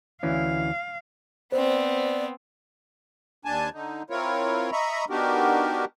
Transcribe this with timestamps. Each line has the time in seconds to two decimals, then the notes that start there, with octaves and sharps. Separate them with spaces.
0.23 D2 E3 C#4 F5
1.52 B3 C4 C5 D5
3.45 D#2 D4 G#5 A5
3.74 D3 D#4
4.10 C4 E4 F4 A#4 C#5
4.72 D#5 E5 A#5 B5 C#6
5.10 B3 D4 D#4 F#4 G4 A#4